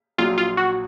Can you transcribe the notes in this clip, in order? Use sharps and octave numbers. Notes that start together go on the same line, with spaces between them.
A#1 A#2 F#3 F4
F4
F#4